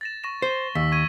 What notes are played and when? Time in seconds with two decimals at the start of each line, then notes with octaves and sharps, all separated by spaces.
0.01 A6 A#6 E7
0.24 C#6 A#6 E7
0.42 C5 G7
0.75 D#2 E6 B6
0.92 C#6 G#6 D#7